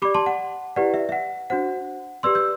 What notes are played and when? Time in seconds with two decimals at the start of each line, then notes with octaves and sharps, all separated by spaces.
0.02 G4 D5 B5 D6
0.15 A5 C6
0.26 F#5
0.76 E4 G4 B4 D5 F#5
0.94 E5
1.09 E5
1.12 F#5
1.50 D4 F#4 C5 F#5
2.23 G4 B4 D5 C6 E6
2.35 E6 G6